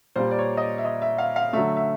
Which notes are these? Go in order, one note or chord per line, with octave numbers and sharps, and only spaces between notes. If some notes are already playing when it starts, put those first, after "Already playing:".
A#2 G3 A#3 C5
D5
C#5
D#5
D5
E5
D#5
E5
F5
F5
D3 F#3 A3 E5
E5